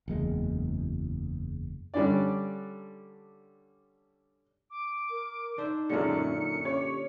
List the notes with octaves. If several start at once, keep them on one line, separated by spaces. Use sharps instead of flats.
F#1 E2 G#3
D3 G3 C#4 D4 D5
D6
A#4
D4 D#4 C5 E5
F#2 A#2 D3 G#3 C#4 C#7
F#2
C#4 G4 C#5